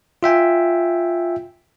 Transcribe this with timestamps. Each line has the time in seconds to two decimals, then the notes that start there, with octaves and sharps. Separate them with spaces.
0.23 F4 E5 G5 G#5